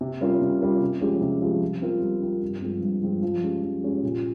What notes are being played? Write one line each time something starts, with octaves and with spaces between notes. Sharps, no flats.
C3
G3 C#4 F4 A#4
C3
G3 C#4 F4 A#4
C3
F3 G#3 C#4 G4
C3
F3 G#3 C#4 G4
G3
C4 F4 A#4
G3
C4 F4 A#4
G2
F3 G#3 C4 F4
G2
F3 G#3 C4 F4
F3
G#3 C#4 G4
F3
G#3 C#4 G4
A#2